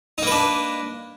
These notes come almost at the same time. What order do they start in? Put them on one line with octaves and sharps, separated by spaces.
D#4 A#3 B4 D4